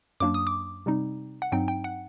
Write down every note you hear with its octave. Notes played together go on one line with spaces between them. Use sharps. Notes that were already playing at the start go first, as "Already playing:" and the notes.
F#2 F#3 A#3 D4 D6
D#6
D6
C3 G3 C4 D#4
F#5
G2 F#3 C4 D#4 G5
G5
F#5